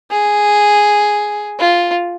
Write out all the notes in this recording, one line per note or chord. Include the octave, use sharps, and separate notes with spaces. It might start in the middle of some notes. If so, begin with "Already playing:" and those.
G#4
F4